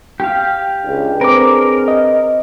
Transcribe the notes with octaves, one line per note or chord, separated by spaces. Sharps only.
G4 F5
C#2 D4 G#4
C4 A#4 B4 D6
D#5